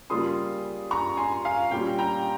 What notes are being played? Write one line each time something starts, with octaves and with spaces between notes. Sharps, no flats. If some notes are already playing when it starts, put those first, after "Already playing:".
C#3 G3 A#3 F4 C6 D#6
A#5 C#6
G#5 C6
F5 G#5
A#2 G3 C#4 G5
G5 A#5